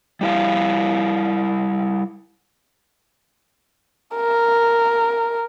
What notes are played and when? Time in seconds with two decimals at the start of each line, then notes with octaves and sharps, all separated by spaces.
0.21 G3 E4 F5
4.15 A#4